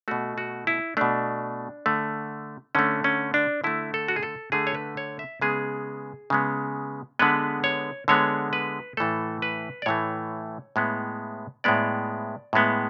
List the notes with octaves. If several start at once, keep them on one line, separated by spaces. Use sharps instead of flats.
B2 A3 F#4
F#4
E4
B2 A3 D4
D3 A3
D3 A3 C#4
C#4
D4
D3 A3 E4
A4
F#4
G#4
A4
D3 A3 G#4
C#5
B4
C#5
E5
C#3 G#3 B3 G#4
C#3 G#3 B3
D3 G#3 B3 B4
C#5
D3 G#3 B3 C#5
B4
A2 E3 A3 A4
B4
D5
A2 E3 A3 C#5
A2 G#3 B3
A2 G#3 B3 D5
A2 G#3 B3